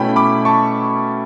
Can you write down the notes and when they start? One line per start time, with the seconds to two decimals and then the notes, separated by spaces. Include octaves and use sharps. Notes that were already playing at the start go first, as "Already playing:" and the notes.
Already playing: B2 A3 C#4 E4 G5 B5
0.16 B5 D6
0.45 A5 C#6